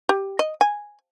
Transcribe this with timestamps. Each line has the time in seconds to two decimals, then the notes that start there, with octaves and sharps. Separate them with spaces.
0.09 G4
0.39 D#5
0.61 G#5